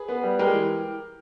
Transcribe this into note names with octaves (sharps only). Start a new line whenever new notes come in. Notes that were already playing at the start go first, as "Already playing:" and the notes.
Already playing: G#4 B4
B3
G3
G#3 G4 A#4
E3